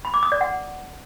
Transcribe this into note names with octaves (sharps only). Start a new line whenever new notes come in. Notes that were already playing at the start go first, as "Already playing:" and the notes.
B5
D6
D#6
D5
F#5